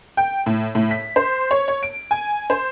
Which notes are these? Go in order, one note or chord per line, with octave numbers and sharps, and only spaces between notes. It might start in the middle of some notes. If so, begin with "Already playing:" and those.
G5
A2
A2
B6
C5
C#5
C#5
D7
G#5
C5